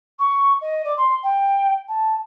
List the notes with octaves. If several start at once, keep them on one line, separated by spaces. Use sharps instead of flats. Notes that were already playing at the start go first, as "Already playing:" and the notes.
C#6
D#5
D5
C6
G5
A5